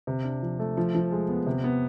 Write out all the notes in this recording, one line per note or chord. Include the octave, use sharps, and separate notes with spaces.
C3
D4
F3
A3
F3
F3
G#3
B3
C3
B3